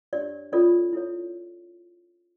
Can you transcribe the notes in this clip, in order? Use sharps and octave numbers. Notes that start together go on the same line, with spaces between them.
D4 G4 C#5 D5
C#4 F4 A4 C#5 D5
E4 A4 C#5